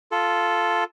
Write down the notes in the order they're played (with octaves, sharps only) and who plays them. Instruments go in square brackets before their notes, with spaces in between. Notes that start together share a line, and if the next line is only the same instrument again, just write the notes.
[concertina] F4 A4